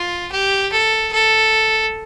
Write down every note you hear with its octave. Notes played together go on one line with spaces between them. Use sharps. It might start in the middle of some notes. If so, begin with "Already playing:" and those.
Already playing: F4
G4
A4
A4